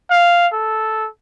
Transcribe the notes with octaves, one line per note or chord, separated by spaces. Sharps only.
F5
A4